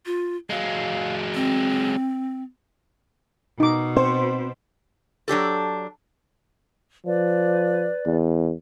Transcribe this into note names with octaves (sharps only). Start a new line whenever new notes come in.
F4
F#3 G#3 F5
C4
B2 D#4 D6
C4 C5
F#3 D4 G4 A4
F3 B4 D5
E2